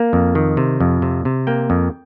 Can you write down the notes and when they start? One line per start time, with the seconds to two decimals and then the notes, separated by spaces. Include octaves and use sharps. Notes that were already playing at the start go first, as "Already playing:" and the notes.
Already playing: A#3 F5
0.13 F2
0.35 D#3
0.57 C3
0.80 F2
1.02 C3
1.25 C3
1.47 A#3 G5
1.70 F2